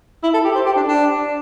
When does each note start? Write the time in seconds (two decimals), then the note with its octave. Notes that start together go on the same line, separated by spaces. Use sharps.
0.23 E4
0.34 A4
0.45 G4
0.55 C5
0.66 G4
0.77 D4
0.87 D4